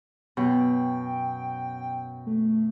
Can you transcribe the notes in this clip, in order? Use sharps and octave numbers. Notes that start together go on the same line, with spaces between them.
F#2 B2 G5
A3